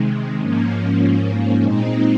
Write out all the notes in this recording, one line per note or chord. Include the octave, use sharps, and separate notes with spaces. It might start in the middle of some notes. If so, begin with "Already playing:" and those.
Already playing: C3 D#3 G#3
G#2 F3 A#3 C#4
A#2 G#3 C4 D#4